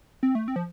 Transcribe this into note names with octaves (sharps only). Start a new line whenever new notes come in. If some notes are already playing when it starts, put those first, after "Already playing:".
C4
A3
C4
F3